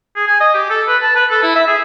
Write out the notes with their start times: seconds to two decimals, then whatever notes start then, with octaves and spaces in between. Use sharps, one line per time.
0.16 G#4
0.27 G#5
0.41 D#5
0.55 G4
0.70 A4
0.88 B4
1.03 A5
1.16 B4
1.31 A4
1.43 E4
1.56 E5
1.68 G#4